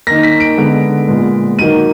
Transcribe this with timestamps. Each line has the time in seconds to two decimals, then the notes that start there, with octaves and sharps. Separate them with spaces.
0.07 D#3 A#3 A#6
0.23 B6
0.40 D7
0.58 D3 G#3 B3
1.08 A#2 G#3 B3
1.59 D#3 F#3 A#3 D#7